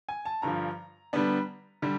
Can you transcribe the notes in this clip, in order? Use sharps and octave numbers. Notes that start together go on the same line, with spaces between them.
G#5
A5
G2 D3 F3 A#5
D3 G3 B3 D4
D3 G3